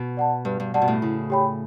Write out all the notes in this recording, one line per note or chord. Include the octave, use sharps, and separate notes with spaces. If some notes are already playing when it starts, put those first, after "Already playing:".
Already playing: B2
D5 F#5 A5
G2 B4
G2
G2 D5 F#5 A5
B2
A2
C#3 E4
G4 C#5 G5 B5